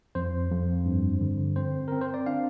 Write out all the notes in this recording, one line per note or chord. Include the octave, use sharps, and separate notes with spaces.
F2 C5
F2
G2
D3
C4 C5
C4 A#4
C5
D5
D4 F5